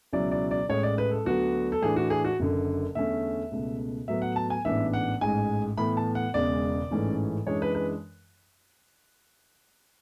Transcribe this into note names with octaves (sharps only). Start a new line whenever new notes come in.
C#2 B2 F#3 C#4 E4 D5
D5
D5
A1 A2 G#3 C#5
D5
B4
A4
D2 D3 F#3 B3 D4 F#4
A4
A2 E3 A3 D4 G#4
F#4
G#4
F#4
F#1 F#2 D3
E2 D3 A3 C#4 E5
C#2 B2 A3
A2 F#3 B3 E5
F#5
A5
G#5
A1 G#2 E3 B3 D4 E5
F#5
A1 G#2 G#3 G#5
A2 E3 B3 E4 B5
A5
F#5
E1 E2 C#3 G#3 D5
A1 G#2 E3 A3 C#4
F#2 E3 G#3 D4 C#5
B4
B4